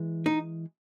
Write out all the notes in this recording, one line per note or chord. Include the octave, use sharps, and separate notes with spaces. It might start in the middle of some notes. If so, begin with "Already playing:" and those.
Already playing: E3 G#3
D#4